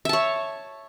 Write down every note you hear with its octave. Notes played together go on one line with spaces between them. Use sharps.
C#5 E5 A5